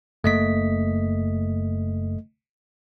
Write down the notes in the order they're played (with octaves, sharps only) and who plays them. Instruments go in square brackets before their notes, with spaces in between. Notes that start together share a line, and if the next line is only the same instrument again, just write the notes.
[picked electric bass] F#1 A#3 [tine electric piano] A3 D#5 B6